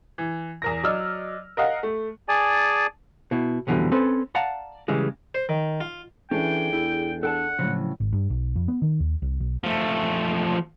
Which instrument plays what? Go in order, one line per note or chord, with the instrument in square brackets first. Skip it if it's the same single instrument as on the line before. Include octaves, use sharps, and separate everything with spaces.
[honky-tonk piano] E3
E2 A#4 A#6
F#3 D5 D#5 E6 F6
A#4 D#5 F5 F#5
A3
[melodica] G#4 D5 G#5 A5
[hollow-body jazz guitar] B2 E4
B1 F2 B2 D3 E3 G3
C4 C#4 A4 B4
D5 F5 F#5 A5 A#5
C#3 E3 G3 G#3
[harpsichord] C5
D#3
F4
[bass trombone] E3 [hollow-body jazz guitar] C#4 [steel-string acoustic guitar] D4 G#4 A4 [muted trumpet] G5
[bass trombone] E2 [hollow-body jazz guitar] E4
[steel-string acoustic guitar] D4 [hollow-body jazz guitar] A4 G5 A5 [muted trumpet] F#5
[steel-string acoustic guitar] A2 C#3 [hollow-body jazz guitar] F3 F#3
[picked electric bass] G#1
G2
B1
F2
B3
D#3
D#2
C2
B1
[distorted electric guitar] F3 A3